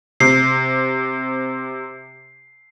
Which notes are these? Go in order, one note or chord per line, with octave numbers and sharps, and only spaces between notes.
C3 C7